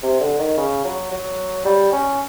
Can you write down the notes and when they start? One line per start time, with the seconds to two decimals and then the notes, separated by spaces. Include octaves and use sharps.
0.03 C3
0.20 D3
0.39 D#3
0.57 C#3
0.84 F#3
1.11 F#3
1.65 G3
1.92 C#4